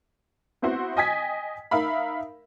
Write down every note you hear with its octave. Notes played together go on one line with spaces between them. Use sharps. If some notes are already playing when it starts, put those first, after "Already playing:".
B3 C4 E4 F#4 C5
D#5 G5 G#5 D#6 G#6 B6
D#4 A#4 E5 F5 B5